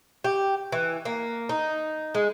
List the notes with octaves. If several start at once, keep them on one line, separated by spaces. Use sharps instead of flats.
G4
E3
A#3
D#4
G#3